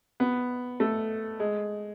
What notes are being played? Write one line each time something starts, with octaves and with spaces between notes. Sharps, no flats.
B3
A3
G#3